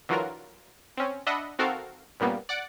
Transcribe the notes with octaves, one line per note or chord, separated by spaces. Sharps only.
D3 E3 F#3 F4 F#4 A#4
C4 C#4
D4 D#5 E5 F#5 B5
D#3 C4 F#4 A4 A#4 F5
G2 A#2 C#3 G3 A#3 B3
D5 F#5 D6